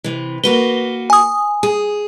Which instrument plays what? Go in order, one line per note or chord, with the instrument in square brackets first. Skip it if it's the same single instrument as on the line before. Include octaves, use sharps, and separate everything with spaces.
[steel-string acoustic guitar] C3 E3
[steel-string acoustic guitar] A#3 F#4 B4 [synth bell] G7
[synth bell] G#5 D#6
[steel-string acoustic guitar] G#4